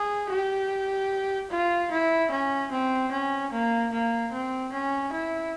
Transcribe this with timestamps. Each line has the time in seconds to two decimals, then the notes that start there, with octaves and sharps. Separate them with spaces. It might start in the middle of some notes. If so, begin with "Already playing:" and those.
Already playing: G#4
0.30 G4
1.51 F4
1.91 E4
2.31 C#4
2.71 C4
3.12 C#4
3.52 A#3
3.92 A#3
4.32 C4
4.73 C#4
5.12 E4